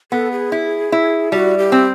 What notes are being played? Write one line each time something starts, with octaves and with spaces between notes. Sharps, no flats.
B3 A4
G#4
E4
E4
G3 F#4
G4
C4